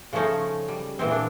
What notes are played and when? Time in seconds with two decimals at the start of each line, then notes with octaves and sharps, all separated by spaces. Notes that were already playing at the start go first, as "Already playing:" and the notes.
0.13 C#3 F3 A3 C#4 D#4
0.69 G3
0.99 A#2 E3 G#3 C4
1.11 D4